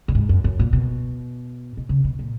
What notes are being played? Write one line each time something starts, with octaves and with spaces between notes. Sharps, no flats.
A#2
G#2
F#2
F#2
A#2
B2
B2
C#3
B2
A#2